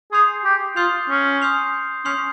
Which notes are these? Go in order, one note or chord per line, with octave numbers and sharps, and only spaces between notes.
G#4 C6 D#6 G6 C7 F7
G4
F4 C6 D#6 G6 C7 F7
C#4
C6 D#6 G6 C7 F7
C#4 C6 D#6 G6 C7 F7